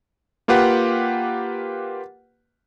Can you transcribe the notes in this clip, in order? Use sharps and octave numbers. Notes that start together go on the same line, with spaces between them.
A#3 F4 G4 B4 F#5